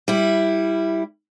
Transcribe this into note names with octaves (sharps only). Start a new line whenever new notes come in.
G3 E4